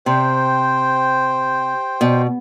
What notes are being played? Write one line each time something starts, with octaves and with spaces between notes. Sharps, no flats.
C3 C5 G5
B2